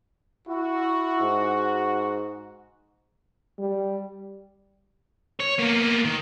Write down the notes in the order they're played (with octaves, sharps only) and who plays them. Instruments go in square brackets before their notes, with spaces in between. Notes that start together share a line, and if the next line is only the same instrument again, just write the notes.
[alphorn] E4 [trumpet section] F#4
[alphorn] G#2
[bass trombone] G3
[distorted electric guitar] C#5
A#3 B3
D#3